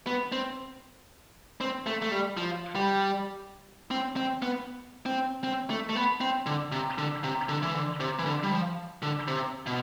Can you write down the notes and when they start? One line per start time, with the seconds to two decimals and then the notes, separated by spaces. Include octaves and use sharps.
0.07 B3
0.32 C4
1.61 C4
1.86 A3
2.02 A3
2.11 G3
2.37 F3
2.75 G3
3.91 C4
4.16 C4
4.42 B3
5.06 C4
5.44 C4
5.70 A3
5.90 A3
5.95 B3
6.21 C4
6.46 D3
6.72 C3
6.98 D3
7.24 C3
7.49 D3
7.62 E3
7.75 D3
8.00 C3
8.19 E3
8.26 D3
8.43 G3
8.52 F3
9.02 D3
9.28 C3
9.67 B2